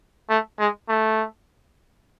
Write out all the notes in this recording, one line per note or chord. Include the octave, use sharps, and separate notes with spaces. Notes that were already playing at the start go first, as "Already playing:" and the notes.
A3
G#3
A3